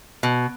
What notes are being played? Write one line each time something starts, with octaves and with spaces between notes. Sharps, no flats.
B2